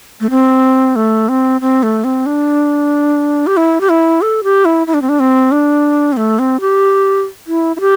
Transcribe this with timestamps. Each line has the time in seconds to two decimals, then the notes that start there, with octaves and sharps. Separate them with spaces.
0.21 A3
0.30 C4
0.96 A3
1.29 C4
1.61 C4
1.83 A3
2.04 C4
2.26 D4
3.47 G4
3.57 E4
3.81 G4
3.89 E4
4.22 A4
4.44 G4
4.65 E4
4.87 E4
4.94 D4
5.02 C4
5.09 D4
5.20 C4
5.52 D4
6.13 C4
6.17 A3
6.39 C4
6.60 G4
7.47 E4
7.76 E4
7.81 G4